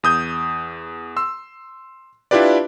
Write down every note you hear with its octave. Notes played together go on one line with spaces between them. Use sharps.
E2 D#6 G6
C6 E6
D4 E4 F4 G4 B4 D5